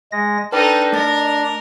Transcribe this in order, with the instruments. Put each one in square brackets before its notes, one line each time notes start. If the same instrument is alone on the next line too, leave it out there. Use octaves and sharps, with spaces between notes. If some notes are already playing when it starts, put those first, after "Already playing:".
[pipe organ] G#3 A#6
[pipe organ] D4 [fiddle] D#4 A4 [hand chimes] B4 G5
[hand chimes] A3 A6 A#6 [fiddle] A#4